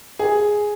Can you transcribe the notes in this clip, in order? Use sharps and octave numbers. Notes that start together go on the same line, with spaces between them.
G#4